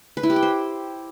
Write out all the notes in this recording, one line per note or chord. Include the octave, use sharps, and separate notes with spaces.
B4
E4
G4
G5
C5